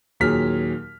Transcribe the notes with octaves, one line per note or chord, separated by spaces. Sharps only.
D#2 A#2 F#3 G#4 F6 B6